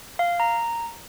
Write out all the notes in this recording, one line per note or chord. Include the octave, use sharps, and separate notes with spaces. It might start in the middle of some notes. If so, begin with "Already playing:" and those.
F5
A#5